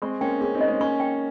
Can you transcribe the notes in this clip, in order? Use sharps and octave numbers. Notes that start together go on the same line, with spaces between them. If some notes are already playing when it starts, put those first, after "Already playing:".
G#3 C4 C#6
A#3 C#4 G5
A#3 C#4 G#4
C4 D#4
D#5
G#3 C4
A#3 C#4 C#6
G5